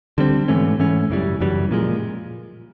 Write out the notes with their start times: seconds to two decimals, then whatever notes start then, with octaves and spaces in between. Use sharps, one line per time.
0.18 D3 G3 C4
0.48 G#2 E3 A3 C#4
0.79 G#2 E3 A3 C#4
1.10 F#2 C#3 E3 G3
1.41 F#2 C#3 E3 G3
1.71 A#2 F3 G#3